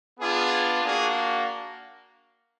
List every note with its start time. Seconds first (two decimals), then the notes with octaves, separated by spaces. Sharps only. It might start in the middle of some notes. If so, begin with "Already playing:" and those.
0.19 B3 D4 F4 G#4
0.84 A#3 D4 F#4 G#4